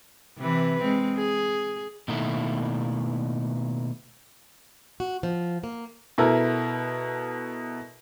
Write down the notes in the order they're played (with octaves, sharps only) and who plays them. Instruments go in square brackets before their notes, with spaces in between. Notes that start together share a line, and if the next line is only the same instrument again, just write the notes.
[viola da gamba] C3 E3 B4
G#3 C4
G#4
[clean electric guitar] B2 D#3 A3 A#3 E4
[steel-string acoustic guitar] F#4
F3
A#3
[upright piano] B2 E4 A4 A#4